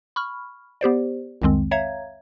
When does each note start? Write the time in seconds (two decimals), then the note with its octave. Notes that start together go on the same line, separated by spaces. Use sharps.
0.16 B5 C#6 F6
0.81 B3 G4 C5 D5
1.42 C2 F2 D#3 G#3 C4
1.71 C#5 E5 F5 A#5 G#6